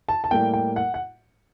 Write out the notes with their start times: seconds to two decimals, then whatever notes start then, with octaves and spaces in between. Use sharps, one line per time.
0.08 A5
0.24 A5
0.31 A2 G3 A#3 G5
0.54 G5
0.76 F#5
0.94 F#5